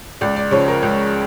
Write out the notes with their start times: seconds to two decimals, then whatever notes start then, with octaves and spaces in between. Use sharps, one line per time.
0.21 C#2 D5
0.36 D5
0.51 C#3 F3 C#5
0.68 A#4
0.83 C#2